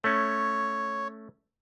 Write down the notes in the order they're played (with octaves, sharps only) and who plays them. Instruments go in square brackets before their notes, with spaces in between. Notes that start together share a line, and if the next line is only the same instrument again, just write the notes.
[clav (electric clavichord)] A3 C#4 [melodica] C#5